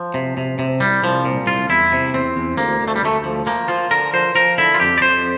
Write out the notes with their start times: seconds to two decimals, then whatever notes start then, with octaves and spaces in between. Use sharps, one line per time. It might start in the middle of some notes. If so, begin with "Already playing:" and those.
Already playing: F3
0.14 C3
0.37 C3
0.59 C3
0.80 C2 G3
1.03 C2 F3
1.25 A#2
1.47 C2 F4
1.69 E2 E4
1.92 C3
2.14 E2 C4
2.36 E2
2.57 D2 A#3
2.81 D2
2.88 A3
2.96 G3
3.02 D2 A3
3.24 F3
3.46 F3 A#3
3.68 F3 F4
3.91 D3 A#4
4.13 F3 C5
4.35 F3 A#4
4.58 D3 E4
4.74 F4
4.80 F2 G4
4.98 D5
5.01 F2 C5